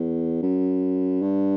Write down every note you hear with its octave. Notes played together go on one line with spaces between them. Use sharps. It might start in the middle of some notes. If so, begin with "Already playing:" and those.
Already playing: E2
F#2
G2